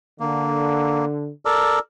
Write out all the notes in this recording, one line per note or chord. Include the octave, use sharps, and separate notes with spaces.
D3 A#3
A4 A#4 D5